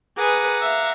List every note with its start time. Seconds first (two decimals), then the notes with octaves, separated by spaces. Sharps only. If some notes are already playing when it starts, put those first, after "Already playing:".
0.17 G#4 B4 F#5 A#5 D6
0.62 E5 F5